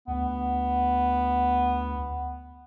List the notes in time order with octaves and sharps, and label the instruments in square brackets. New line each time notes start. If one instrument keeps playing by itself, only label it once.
[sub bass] D2 [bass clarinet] B3